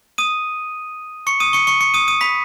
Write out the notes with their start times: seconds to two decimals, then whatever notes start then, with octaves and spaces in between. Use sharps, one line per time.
0.18 D#6 D#7
1.27 C#6 C#7
1.40 D#6 D#7
1.53 C#6 C#7
1.67 C#6 C#7
1.81 C#6 C#7
1.94 D#6 D#7
2.08 D#6 D#7
2.21 B5 B6